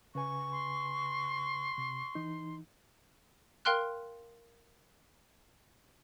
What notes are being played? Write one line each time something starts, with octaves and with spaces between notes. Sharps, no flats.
C#3 B4 G#5 C#6
C6
C3
E3 D#4
A#4 F5 G5 C6 F6 F#6